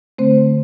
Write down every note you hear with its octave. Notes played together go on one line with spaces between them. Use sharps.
D3 A3 C4 C5